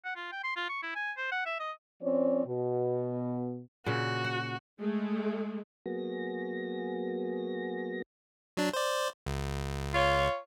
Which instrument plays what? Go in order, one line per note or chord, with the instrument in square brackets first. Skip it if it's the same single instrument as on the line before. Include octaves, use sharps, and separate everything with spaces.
[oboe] F#5
F4
G5
C6
F4
C#6
E4
G#5
C5
F#5
E5
D#5
[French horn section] F3 C4 C#4 C#5 D5
B2
[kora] A#2 C#3 [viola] F#4
[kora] F#5
[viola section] G#3 A3
[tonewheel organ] F#3 A#3 B3 F#4 G#4 A#6
[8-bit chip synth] F#3 D4
C5 D5
C#2
[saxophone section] F4 C#5